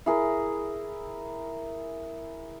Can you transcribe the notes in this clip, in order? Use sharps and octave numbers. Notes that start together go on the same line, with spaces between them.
E4 G#4 A#4